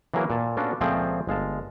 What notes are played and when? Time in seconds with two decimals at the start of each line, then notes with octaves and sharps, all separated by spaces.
0.14 E3 F#3 A#3 G#4 A#4 B4
0.30 A#2 A5
0.57 B3 C#4 D4 F4 F#4 A4
0.81 C#2 A#2 F3 A3 C4 G#4
1.27 G1 G#3 F5 A5